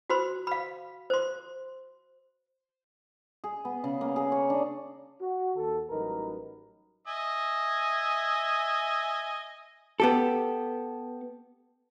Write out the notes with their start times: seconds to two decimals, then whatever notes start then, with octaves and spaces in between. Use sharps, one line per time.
0.10 F#4 C5 B5 C6
0.47 F5 B5
1.10 C5 C6
3.44 G#4
3.65 B3
3.84 C#3
4.01 A#3
4.16 G#4
4.32 C#5
4.50 D4
5.21 F#4
5.55 D#2 A4
5.90 A1 F#3 G3 D#4 A#4 B4
7.08 D#5 E5 G#5
10.00 B3 G4 A4